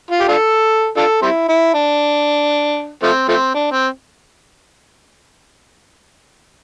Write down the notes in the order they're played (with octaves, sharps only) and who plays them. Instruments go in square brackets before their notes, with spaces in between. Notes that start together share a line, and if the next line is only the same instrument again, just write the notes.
[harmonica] F4
G4
D4 F4 A4
D4 F4 A4
G3 C4 E4
E4
D4
F3 A3 C4
F3 A3 C4
D4
C4